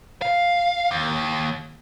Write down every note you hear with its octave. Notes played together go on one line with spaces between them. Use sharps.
F5
D#2